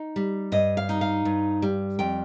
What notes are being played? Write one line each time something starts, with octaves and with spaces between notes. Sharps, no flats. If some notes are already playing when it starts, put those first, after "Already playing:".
Already playing: D#4
G3
G2 D#5
F5
D#4
F5
G2
G3
F2 G5